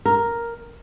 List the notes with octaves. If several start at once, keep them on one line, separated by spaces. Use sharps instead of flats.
A#4